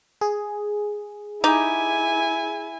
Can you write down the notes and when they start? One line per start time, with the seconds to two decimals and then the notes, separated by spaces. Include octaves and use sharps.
0.21 G#4
1.44 D#4 E4 G4 G#5